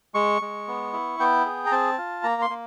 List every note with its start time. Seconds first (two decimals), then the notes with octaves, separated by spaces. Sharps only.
0.14 G#3 C#6
0.42 G#3
0.68 B3
0.93 E4
1.20 B3 G5
1.45 G#4
1.66 A#5
1.71 C4 A5
1.98 F4
2.23 A#3 A#5
2.42 C6
2.50 A#3